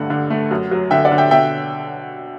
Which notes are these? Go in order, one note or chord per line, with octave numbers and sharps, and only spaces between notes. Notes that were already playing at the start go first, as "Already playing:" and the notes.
Already playing: G2 D3 A3 F#5
D3
A3
F#2
F#3
D3 E5 G5
D5 F#5
D3
E5 G5
B2 E5 G5